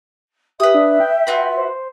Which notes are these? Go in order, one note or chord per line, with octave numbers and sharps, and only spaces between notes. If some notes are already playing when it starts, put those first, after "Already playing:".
G4 B4 E5 D#6
D4
G5
F4 F#4 B4
C5